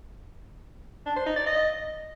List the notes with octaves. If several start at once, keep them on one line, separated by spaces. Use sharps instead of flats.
D4
C5
D#4
D5
D#5